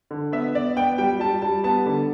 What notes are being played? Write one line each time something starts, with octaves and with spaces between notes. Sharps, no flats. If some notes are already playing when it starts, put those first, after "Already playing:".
D3
B3 E5
B3 D5
B3 G5
G3 G5
G3 A5
G3 A5
B3 A5
D3